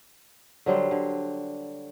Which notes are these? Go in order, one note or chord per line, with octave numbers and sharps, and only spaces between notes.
D3 F#3 G3 C5
D3